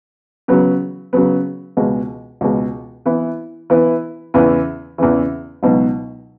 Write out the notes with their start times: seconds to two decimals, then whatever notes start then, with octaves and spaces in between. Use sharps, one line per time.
0.48 C#3 F#3 B3
1.13 C#3 F#3 B3
1.77 C#2 B2 G#3
2.41 C#2 B2 G#3
3.06 E3 B3 E4
3.70 E3 B3 E4
4.34 E2 C#3 E3
4.98 E2 C#3 E3
5.63 C#2 B2 F#3 B3 D#4